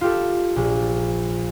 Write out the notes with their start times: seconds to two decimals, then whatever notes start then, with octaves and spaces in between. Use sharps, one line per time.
0.01 F4 G4 A4
0.56 A#1